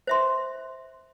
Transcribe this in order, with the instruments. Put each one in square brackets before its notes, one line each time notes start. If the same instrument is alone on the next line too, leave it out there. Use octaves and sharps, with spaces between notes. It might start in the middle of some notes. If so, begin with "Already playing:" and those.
[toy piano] C5 E5 C6